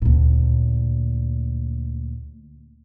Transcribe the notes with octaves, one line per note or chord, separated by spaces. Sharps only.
D2 A#2